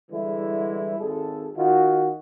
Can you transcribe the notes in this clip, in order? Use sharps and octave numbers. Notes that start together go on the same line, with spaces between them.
D3 E3 G3 G#3 E4
G#1 G#3 A4
D#3 F4 F#4